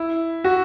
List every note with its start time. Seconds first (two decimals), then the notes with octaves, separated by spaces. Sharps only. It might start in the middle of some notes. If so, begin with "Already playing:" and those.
Already playing: E4
0.44 F#4